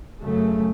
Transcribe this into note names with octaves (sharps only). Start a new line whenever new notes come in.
F#2 C#3 A3